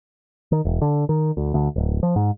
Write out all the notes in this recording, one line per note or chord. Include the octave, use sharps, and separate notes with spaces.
D#3
E1
D3
D#3
D2
D2
D1
F3
G#2